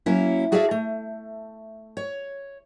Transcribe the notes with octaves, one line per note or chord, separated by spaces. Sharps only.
F#3 A#3 C#4 E4
F#4 G#4 A4 D5 E5 F5
A3
C#5